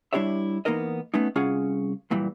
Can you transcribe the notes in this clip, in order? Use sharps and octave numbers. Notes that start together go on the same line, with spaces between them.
G3 D4 E4 G4 C#5 E5
E3 A#3 B3 D#4 A#4 D#5
A3 B3 C#4 D#4
C2 C#4 F4 G#4 F5 F#5
F#2 A#2 E3 G3